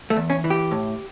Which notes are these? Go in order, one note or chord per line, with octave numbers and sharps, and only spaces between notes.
A3
E2
C#4
E3
G4
A2